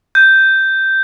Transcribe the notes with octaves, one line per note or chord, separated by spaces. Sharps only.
G6